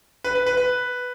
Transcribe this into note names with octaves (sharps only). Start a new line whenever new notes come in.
B4
B4
B4
B4